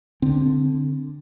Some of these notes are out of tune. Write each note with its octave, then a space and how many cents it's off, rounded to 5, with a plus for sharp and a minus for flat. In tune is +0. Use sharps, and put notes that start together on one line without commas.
D3 +0 C4 +0